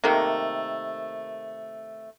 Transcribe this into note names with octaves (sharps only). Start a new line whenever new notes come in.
C3 D#3 A3 A#3